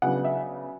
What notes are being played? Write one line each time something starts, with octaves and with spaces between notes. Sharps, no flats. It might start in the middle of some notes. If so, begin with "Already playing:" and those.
C#3 F#3 B3 D4 F#5
E5